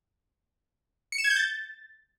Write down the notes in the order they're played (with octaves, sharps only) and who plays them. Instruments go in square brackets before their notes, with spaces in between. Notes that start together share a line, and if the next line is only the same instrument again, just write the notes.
[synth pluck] C#7
E7
G#6
G6
A6